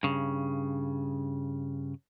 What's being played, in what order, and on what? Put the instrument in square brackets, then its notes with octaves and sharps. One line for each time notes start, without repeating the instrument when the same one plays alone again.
[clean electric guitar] G2 C#3